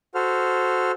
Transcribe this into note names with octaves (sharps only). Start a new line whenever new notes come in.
F#4 A4 C5 F6